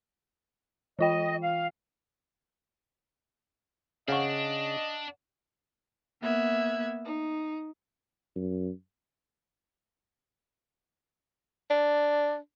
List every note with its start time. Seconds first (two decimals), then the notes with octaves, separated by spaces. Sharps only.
0.99 E3 F4 D#5 G5
1.41 F5
4.08 C#3 D4 D#5 F5 F#5 C#6
6.22 A#3 B3 E5 F#6 G#6
7.04 D#4
8.36 F#2
11.70 D4